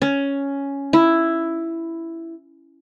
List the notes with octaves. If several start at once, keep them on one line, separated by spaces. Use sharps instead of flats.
C#4
E4